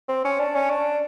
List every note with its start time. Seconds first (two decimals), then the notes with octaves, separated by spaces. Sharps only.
0.08 C4
0.24 C#4
0.39 D4
0.55 C#4
0.70 D4